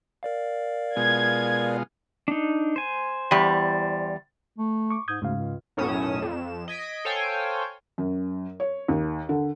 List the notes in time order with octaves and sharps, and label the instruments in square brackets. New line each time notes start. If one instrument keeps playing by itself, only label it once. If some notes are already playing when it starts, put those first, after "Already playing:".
[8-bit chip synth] A#4 D5 F5
[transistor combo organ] B2 G#3 F4 [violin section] G#6
[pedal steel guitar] D4 D#4
C5 G#5
[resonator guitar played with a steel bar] E2 G3
[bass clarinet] A3
[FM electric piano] C#6 D6
[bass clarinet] G#2 [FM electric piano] D#6 G6 G#6
[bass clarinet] D2 [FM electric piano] G#2 C#3 F5
[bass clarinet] C#2
[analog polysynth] B1 F#2 A2 C#4 D#6 E7
F2 E7
D#5 G#6 B6 D7
A4 C5 C#5 F5 G5 G#5
[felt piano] F#2
C#5
D#2
D3